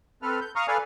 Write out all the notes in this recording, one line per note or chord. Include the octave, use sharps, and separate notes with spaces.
C4 A4 B4 F6
G6
F5 A#5 C#6 D#6 F6
A4 B4 D5 F5 G#5 F6